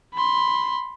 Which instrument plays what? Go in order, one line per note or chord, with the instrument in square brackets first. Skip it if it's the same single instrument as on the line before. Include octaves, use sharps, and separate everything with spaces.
[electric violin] B5 C6